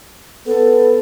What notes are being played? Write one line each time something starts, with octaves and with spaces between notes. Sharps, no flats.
B3 A4